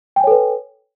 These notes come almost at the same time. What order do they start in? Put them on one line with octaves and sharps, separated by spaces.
G5 G#5 C#5 A4 B4